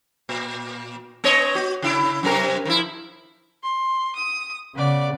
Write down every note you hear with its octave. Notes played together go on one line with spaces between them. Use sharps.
A#2
B3 C#5 D#5
F#4
C#3 E4
F#2 C3 A#4
D#3 F3 E4
C6
D#6
C#3 B3 D5